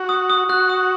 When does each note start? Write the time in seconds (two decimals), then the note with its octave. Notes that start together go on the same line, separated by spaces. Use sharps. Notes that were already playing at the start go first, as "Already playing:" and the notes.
Already playing: F#4
0.09 D#6
0.30 D#6
0.49 F#4 F#6
0.69 D#6